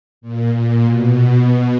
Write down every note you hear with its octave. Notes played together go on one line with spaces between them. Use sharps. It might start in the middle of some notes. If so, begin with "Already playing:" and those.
A#2
A#2
B2